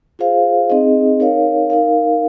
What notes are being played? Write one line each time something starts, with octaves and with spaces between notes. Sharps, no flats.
F4 G#4 C5 F5
C4 D#4 G#4 D#5
D#4 A#4 C#5 F5
D#4 A#4 F5